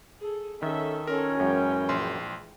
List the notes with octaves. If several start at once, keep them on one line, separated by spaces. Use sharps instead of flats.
G#4 A4
D#3 C#4 A4 E5
C#4 F4 A4 A#4
F#2 E3 G#3 G5
A#1 C6